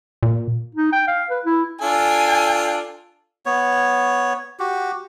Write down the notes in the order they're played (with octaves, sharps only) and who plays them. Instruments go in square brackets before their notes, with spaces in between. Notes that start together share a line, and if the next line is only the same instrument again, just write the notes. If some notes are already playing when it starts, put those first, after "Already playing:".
[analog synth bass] A#2
[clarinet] D#4
G5
F5
B4
E4
[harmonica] D4 F4 A4 [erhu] G#5
[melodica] B3 C#5
F#4 G4